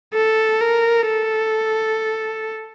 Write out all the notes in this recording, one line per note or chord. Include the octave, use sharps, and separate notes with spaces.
A4
A#4
A4